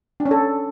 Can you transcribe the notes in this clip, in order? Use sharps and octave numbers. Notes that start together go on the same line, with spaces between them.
D4
C#4
A4